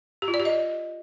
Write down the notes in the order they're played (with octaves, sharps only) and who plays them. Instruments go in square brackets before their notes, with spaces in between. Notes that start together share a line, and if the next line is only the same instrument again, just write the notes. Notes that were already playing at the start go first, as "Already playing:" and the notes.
[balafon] G4
F4
D5
G4
D#5